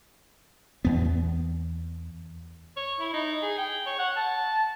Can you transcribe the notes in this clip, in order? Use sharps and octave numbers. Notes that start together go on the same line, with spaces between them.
E2 B3
C#5
E4
D#4
G#4
G5
C#5
F#5
A5